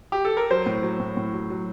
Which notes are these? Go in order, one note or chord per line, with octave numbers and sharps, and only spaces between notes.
G4
A4
A#4
F#3 C5
A2
F#3
A2
A2
F#3
F#3